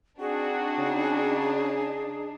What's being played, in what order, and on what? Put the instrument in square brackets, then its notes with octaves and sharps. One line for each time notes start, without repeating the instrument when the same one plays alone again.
[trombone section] C4 F#4 [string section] D4 D#4 [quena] G#4
[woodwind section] C#3